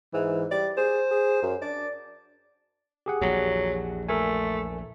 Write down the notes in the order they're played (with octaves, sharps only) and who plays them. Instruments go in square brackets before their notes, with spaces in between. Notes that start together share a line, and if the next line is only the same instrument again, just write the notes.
[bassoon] G#2 [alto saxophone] E3
[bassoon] G3 [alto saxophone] D5
[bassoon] G#4 [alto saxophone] C5
[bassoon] G#4
F#2
[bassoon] D4 [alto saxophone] D5
[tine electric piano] G4 G#4 F#5
[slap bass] A#1 E2 [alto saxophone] F#3
[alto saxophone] A3 [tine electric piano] A4 A#4 G#5